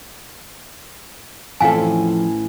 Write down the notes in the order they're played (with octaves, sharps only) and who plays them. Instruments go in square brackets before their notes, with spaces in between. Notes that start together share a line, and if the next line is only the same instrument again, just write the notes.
[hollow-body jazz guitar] F2 F3 A4 [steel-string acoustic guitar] A2 E3 C#4 [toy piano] F5 G#5